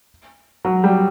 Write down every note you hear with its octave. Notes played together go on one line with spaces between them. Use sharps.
F#3
G3